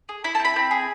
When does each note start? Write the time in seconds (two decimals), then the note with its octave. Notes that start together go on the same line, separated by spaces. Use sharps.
0.09 G#4
0.24 E4 B5
0.35 A5
0.40 C4
0.45 B5
0.56 C4
0.71 G#4